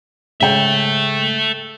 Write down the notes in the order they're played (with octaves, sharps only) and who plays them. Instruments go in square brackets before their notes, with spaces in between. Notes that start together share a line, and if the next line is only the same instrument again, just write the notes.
[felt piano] G#2 C#3 G5 [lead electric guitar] A4 E5